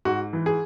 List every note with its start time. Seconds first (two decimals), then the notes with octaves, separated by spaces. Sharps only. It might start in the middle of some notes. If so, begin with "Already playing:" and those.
0.05 G#2 F#4
0.33 E3
0.46 G#4